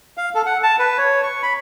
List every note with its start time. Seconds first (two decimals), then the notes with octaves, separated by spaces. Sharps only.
0.18 F5
0.35 A4
0.46 F#5
0.63 A5
0.79 B4
0.98 C#5
1.23 C#6
1.43 B5